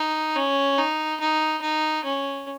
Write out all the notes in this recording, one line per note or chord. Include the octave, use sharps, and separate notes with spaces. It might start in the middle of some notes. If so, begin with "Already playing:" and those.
Already playing: D#4
C#4
D#4
D#4
D#4
C#4